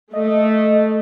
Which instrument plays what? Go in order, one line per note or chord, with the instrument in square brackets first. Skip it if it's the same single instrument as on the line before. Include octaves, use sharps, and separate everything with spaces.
[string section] A3 [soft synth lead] D#5